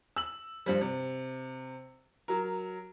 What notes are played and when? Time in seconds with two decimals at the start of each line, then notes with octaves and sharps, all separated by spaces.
0.16 E6 F#7
0.66 G2 F3 G3
0.81 C3
2.28 F#3 A#4